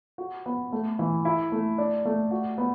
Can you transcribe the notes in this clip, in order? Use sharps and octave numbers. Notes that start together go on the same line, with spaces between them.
F#4
B3
A3
E3
E4
A3
D4
A3
F#4
B3